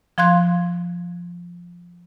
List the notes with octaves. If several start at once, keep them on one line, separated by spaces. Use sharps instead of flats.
F3 F5 C6 F#6 G#6